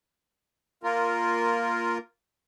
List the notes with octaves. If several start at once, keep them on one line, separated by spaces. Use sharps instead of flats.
A#3 F4 A#4